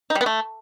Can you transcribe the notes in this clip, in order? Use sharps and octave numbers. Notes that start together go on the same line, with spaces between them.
D#4
G3
B3
A3